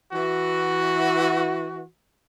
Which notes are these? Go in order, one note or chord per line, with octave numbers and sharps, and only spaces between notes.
E3 F#4